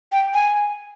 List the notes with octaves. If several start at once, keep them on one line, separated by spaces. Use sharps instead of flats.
G5
G#5